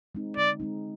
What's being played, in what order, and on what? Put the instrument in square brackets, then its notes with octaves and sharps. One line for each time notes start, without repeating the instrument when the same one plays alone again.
[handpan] G#3 C4 D#4
[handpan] D3 [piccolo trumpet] D5
[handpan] G#3 C4 D#4